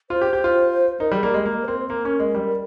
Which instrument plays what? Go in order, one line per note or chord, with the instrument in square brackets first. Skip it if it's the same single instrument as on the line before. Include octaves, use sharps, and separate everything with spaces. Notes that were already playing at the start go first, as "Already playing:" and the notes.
[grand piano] F4 [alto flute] C5
[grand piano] G4
G4
F4
[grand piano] D#4 [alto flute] A#4
[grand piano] G3
[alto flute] G#4
[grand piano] A#3
[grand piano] G#3 [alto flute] G4
[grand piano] A#3 [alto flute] A#4
[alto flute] C5
[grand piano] C4 [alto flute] A#4
[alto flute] C5
[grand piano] A#3 [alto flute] A#4
[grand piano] C#4
G#3
G3